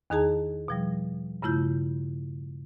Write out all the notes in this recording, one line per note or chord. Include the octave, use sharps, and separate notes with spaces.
E2 D#3 D#4 G#4 A5 A#5
B2 F3 G3
G2 C#3 A3 E4 F4 G6